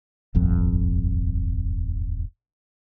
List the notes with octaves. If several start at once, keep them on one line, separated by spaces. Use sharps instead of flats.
D#1 G#1 F2